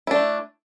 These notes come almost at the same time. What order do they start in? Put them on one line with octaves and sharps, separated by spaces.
E4 D4 A3